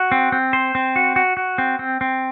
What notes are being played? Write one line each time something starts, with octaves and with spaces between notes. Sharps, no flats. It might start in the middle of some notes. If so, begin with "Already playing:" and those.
Already playing: F#4
C4
C4
C5
C4
F#4
F#4
F#4
C4
C4
C4